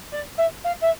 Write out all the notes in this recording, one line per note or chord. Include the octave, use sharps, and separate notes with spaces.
D5
E5
F5
E5